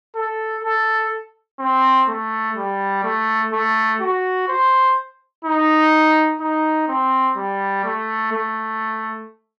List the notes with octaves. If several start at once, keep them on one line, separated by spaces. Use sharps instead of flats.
A4
A4
C4
A3
G3
A3
A3
F#4
C5
D#4
D#4
C4
G3
A3
A3